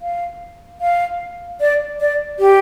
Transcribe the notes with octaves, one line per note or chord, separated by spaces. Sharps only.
F5
F5
D5
D5
G4